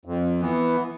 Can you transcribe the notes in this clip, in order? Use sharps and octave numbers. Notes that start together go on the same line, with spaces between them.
F2
E3 B3